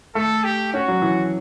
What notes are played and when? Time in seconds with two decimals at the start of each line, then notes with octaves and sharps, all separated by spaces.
0.15 A3 A4
0.44 G4
0.73 C#4 F#4
0.88 F#3
1.02 E3